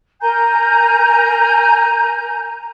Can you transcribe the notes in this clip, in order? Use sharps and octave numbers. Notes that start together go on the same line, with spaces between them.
A#4 G#5 A#5 G6